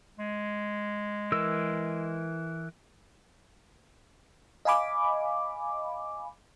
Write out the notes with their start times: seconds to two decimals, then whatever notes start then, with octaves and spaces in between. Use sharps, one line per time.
0.19 G#3
1.32 E3 A#4 E6
4.65 D#5 F5 G#5 B5 D6